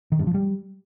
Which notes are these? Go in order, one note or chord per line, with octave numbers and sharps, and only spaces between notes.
D#3
G2
F3
G3